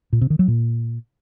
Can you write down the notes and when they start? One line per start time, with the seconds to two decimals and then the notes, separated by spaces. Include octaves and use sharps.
0.13 A#2
0.21 C3
0.30 D#3
0.39 F#3
0.48 A#2